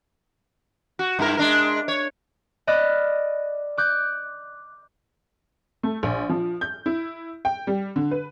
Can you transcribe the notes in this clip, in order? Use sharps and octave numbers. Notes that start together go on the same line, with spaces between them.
F#4
G2 E4 A#4
G#3 D4 A#4
C#5
D5 D#5 B5 F6 F#6
D6 F#6 G6
A3
A#1
F3
G6
E4
G5
G3
D3
B4